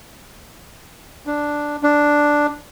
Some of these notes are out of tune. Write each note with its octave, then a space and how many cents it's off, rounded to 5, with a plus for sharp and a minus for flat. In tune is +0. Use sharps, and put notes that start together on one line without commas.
D4 +0
D4 +0